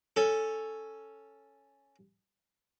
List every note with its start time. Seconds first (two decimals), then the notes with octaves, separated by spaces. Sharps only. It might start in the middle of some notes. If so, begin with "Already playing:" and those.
0.16 C#4 A4